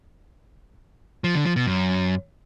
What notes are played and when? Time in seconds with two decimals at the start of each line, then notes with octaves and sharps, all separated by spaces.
1.24 F3
1.35 D3
1.45 F3
1.56 B2
1.67 F#2